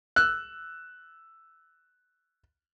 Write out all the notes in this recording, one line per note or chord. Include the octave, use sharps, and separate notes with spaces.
E6 F#6